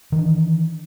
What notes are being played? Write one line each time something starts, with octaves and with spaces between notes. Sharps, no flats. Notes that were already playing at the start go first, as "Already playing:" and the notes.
D#3 E3 D4